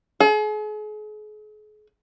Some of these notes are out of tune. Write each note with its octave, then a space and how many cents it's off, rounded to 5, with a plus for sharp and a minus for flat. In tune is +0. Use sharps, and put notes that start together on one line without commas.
G#4 +40